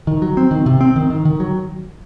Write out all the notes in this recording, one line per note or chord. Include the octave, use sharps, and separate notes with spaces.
D#3
F#3
C4
D#3
C3
C4
D#3
D#3
D#3
F#3